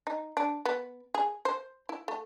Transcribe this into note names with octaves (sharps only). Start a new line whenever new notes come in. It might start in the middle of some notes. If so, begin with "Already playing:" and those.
D#4
D4
B3
G#4
C5
E4
A3